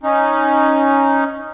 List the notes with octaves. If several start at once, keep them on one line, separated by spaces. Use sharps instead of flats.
C#4 D#4